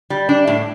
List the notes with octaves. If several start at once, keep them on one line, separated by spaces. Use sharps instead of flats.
G3
D4
A2